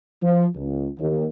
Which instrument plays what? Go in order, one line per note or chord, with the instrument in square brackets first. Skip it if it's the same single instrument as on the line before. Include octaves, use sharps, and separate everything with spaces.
[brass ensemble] F3
C#2
D#2